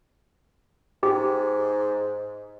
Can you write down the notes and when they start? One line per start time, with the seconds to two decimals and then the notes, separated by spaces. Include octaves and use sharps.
1.03 G#2 G4